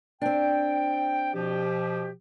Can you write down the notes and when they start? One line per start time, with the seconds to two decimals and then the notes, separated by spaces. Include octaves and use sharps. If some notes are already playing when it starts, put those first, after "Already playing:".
0.22 C4 D4 G5
1.34 B2 F3 G4